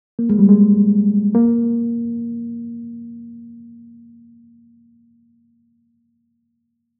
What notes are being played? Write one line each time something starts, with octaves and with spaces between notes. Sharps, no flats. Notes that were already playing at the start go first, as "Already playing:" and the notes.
A#3
G#3
G3
G#3
A#3